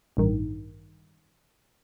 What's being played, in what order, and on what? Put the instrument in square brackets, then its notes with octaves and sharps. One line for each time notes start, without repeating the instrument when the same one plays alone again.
[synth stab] A1 G2 D#3